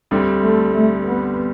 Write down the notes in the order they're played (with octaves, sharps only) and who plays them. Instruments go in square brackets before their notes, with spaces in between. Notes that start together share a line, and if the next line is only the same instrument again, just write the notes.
[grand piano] D2 D3 G3 C4
[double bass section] A3
A3
B3